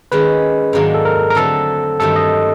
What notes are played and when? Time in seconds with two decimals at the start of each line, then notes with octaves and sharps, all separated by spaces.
0.12 D#3 G#3 C#4 B4
0.73 G#2 D#3 F#3 A#3 D4
0.94 A4
1.05 A#4
1.30 A#4
1.35 D3 F#3 A3 C4 A4
2.00 G2 D#3 F#3 A3 A4
2.16 D#5